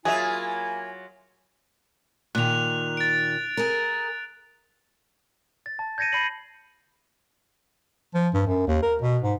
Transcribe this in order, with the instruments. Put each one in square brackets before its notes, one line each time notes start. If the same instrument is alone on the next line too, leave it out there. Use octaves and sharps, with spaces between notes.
[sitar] F#3 F4 E5 [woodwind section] A#3 E4 G#5 [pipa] G#4
[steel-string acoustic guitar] A#2 D#3 [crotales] F#6 F7
[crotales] A6 D7
[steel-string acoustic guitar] G#4 A#4
[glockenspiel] A6
A5
G6 G#6 A#6 C#7 D#7
B5 G6 C7 C#7 D#7 F#7
[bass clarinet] F3
G2
F#2
D#2
A#4
B2
G#2